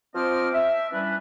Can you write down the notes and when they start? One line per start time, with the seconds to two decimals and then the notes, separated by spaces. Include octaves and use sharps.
0.15 F3 C4 C5 D#5 D6 F6
0.53 E5
0.92 E3 G3 C#4 D4 B4